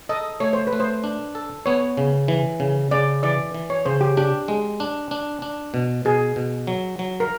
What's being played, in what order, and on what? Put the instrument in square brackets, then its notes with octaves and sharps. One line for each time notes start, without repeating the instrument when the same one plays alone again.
[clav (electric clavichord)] A4 [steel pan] D#5
[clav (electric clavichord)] A3 [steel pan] C#5
[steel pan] C5
B4
[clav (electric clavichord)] A3
[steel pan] C5
[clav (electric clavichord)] D4
A4
[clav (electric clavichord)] B3 [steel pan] C#5
[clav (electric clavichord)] C#3
E3
C#3
[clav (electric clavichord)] C#3 [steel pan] D5
[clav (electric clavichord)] E3 [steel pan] D5
[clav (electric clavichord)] E3
[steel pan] C#5
[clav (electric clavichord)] C#3 [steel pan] C5
[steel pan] G4
[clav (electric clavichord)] D4 [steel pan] G4
[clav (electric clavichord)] G#3
D4
D4
D4
B2
[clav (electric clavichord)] B2 [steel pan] G#4
[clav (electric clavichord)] B2
F#3
F#3
[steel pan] A#4